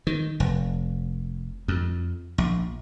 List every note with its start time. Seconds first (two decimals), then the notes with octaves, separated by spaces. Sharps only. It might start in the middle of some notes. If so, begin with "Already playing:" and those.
0.07 D#3
0.40 F1
1.68 F2
2.38 A#1